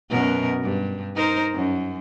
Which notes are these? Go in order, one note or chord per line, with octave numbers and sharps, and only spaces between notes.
F#2 B2 A#4
G2
D#4 A#4 C5
F#2